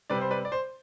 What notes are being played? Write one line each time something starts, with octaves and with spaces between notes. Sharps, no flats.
C3 G3 C4 B4 D5
C5
B4 D5
D5
C5